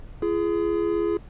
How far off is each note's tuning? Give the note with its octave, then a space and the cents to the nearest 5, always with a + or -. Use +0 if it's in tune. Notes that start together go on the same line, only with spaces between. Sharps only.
F4 -45 G#4 +5